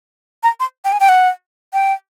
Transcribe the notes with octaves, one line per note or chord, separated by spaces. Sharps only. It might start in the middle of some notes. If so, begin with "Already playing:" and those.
A#5
C6
G5
G#5
G5
F#5
G5